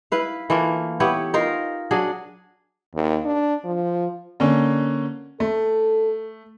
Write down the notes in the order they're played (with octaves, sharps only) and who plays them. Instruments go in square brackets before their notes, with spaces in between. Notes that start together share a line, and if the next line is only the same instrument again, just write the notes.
[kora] E4 B4 F5
E3 A3 A#3 F4
B3 E4 G4 C#5
D#4 F4 A#4 F5
F#3 D4 G#4
[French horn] D#2
D4
F3
[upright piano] D3 A#3 C#4
[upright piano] A3 [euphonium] A4